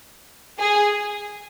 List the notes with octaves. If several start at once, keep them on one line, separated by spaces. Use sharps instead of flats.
G#4